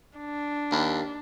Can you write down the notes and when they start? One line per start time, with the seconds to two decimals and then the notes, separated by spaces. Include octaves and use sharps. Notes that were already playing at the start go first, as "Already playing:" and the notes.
0.18 D4
0.72 D#2